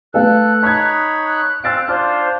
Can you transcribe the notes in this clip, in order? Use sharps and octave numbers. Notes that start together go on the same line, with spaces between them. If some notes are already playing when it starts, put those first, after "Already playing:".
A3 A4 B4 F5 F#6
D#4 C#5 A5 B5 G#6
F#6
C4 F5 E6 A6 D7
D4 F4 C5 F6